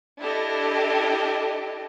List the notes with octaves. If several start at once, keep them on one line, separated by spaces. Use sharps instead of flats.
D4 E4 G4 A4 D#5